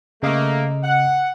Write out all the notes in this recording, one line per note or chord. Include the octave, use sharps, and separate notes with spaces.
C#3 A3 A#3 D#5
F#5